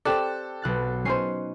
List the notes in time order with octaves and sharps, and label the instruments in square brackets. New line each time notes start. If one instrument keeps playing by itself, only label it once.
[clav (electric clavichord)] C4 G4 D5 [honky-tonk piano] A4 [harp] F#6 G6 E7
[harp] B1 F#6 A6
[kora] C#4 D#4 C5 [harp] C7